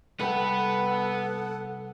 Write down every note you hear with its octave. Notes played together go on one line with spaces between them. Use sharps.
C2 G3 B3 A4 B4 F#5 G5